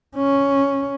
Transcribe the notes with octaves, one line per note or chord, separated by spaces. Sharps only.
C#4